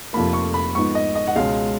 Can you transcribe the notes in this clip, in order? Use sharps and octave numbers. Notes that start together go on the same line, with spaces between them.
F1 F2 F3 A#3 B5
C#6
B5
G#2 F3 B3 D#4 C#6
D#5
D#5
F#5
C#2 B2 G#3 C#4 F5